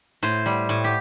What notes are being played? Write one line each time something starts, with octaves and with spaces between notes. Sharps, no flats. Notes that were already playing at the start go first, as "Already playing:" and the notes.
A2 C5
G3
A2
G4